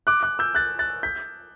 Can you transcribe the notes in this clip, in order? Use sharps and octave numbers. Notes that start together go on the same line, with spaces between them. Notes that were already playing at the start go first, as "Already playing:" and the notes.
D6 F#6
D6 F#6
E6 G6
F#6 A6
F#6 A6
G6 B6